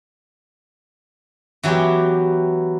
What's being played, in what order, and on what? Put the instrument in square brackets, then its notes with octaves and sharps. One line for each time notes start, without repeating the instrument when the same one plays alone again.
[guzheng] E3 F#3 B3 E4 G4